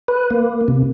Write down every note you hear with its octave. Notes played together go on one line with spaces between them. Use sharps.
B4
A#3
C3